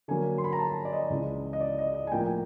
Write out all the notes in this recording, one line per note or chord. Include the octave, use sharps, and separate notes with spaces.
D3 F#3 A#3 G#5
C6
B5
A#5
A5
D5
D#5
C#2 C#3 E3 G#3
D#5
D5
D#5
D#5
G#5
A2 F3 A#3 G5
G5